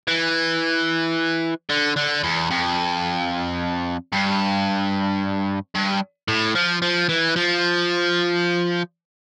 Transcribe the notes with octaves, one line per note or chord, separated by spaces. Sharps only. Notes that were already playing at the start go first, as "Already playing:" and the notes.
E3
D3
D3
E2
F2
G2
G2
A2
F3
F3
E3
F3